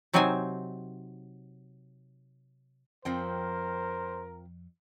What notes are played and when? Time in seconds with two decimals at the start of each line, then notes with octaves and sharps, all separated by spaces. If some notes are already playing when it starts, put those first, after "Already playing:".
0.13 C3 F#3 C4 D#4 C5 G#5
3.05 F2 F3 C4 A#4 C5 G5